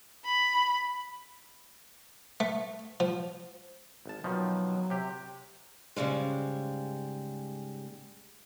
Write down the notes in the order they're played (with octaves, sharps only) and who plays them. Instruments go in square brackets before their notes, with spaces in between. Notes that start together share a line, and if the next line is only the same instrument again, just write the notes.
[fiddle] B5
[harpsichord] A3
F3
[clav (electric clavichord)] G#1 A5
[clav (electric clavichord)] B2 D#3 F3 [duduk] F#3
[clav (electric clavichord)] C3 G4
[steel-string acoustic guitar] G#2 C#3 G3 G#3